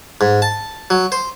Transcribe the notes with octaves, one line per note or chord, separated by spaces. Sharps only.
G#2
A5
F#3
C5